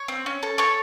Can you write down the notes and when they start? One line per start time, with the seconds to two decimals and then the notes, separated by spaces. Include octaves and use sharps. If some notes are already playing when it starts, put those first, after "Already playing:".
Already playing: C#5
0.08 C4
0.26 C#4
0.43 A4
0.58 A4 C#5